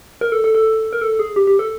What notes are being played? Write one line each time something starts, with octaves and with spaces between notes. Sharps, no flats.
A#4
A4
A4
A4
A#4
A4
G#4
G4
G4
A4